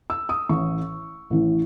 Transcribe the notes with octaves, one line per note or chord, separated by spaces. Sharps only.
E6
D#6
A1 A2 E3 C#6
A1 A2 E3